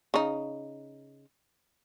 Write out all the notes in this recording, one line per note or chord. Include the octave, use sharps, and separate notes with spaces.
C#3 D#4